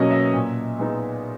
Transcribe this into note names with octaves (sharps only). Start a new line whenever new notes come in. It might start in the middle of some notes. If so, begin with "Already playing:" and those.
Already playing: B2 F#3 A#3 C#4 D#5
E5
A#2
G#3 B3 D#4